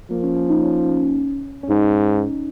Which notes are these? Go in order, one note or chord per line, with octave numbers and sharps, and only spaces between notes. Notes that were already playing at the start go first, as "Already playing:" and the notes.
F3 A#3
C#4
C#4
D#4
C#4
C#4
G#2 D#4